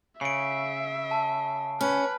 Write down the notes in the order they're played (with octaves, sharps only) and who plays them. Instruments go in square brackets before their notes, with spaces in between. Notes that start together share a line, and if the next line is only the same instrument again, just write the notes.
[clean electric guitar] C#3 [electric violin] E5 [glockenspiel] C7 D7
[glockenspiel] A5
[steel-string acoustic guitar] C#4 [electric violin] B4 [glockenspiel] F6